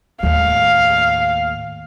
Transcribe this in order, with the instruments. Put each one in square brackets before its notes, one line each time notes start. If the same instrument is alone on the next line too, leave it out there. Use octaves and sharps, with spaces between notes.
[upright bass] D#2 A2 [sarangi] F5